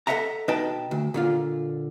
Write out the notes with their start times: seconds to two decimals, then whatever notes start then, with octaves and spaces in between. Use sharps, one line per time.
0.07 A4 B4 D#5 E5 F#5 A#5
0.48 B2 D#4 B4 D#5 G5 A5
0.91 D2
1.14 A#2 D3 F4